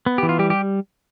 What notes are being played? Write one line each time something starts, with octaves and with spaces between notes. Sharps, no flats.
B3
E3 G4
F4
G3 G4
G4